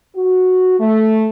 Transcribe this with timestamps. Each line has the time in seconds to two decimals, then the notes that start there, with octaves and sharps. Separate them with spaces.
0.16 F#4
0.80 A3